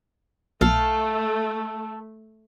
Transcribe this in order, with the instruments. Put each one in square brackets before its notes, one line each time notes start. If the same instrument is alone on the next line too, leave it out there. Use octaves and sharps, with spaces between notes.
[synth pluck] B1 [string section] A3 [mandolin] A4 F5